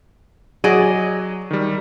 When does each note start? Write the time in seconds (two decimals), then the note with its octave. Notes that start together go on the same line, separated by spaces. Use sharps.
0.64 F#3 F#4 G#4 D5 D#5 D#7
1.51 D#3 G3